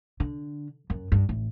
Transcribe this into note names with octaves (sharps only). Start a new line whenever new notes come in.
D3
F#2
G2
A1